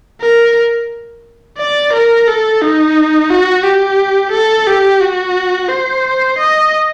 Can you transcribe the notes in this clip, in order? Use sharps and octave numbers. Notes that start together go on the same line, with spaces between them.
A#4
D5
A#4
A4
D#4
F#4
G4
A4
G4
F#4
C5
D#5